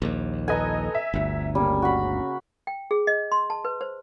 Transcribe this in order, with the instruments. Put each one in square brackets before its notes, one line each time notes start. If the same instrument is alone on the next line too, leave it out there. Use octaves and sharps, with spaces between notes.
[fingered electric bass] A#1 D#2
[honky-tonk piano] A4 B4 D#5 [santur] G#5 A#5
[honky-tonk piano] E5
[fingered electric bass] G1 D2
[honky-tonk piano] C#3 A#3 [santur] G3
[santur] F#4 B5
[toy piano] G5
G#4
D#5
C6
A5
B4
C5